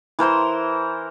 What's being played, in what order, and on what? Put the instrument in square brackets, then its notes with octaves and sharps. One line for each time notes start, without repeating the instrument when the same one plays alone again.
[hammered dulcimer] E3 A#4 C5 C6